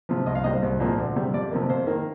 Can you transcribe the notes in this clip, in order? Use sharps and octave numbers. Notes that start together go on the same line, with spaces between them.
C3 F3
C2 D#5
F5
C3 G3 D#5
C5
C2
A#2 F3 G#3 C4
D2
C3 G3
F2 D5
C3 F3 A#3
F2 C5
D#3 A#3